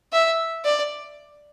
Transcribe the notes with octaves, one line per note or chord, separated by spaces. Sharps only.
E5
D5